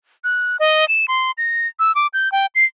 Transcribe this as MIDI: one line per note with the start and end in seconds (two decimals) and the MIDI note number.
0.24 0.57 90
0.60 0.87 75
0.88 1.06 100
1.08 1.31 84
1.38 1.67 94
1.79 1.94 88
1.95 2.07 86
2.14 2.31 91
2.32 2.46 79
2.55 2.65 96